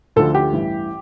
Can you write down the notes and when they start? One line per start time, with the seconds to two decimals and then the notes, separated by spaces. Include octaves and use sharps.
0.16 D2 D3 F3 A4
0.35 G4
0.52 A1 G2 E3